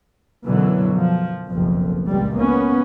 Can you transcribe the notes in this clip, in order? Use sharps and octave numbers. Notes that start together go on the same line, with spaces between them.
F#2 B2 D3 E3 F#3
F3
F#1 B1 F2
C#2 A#2 G3
A#3 B3 C#4